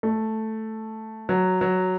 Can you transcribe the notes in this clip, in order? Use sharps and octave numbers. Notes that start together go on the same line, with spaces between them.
A3
F#3
F#3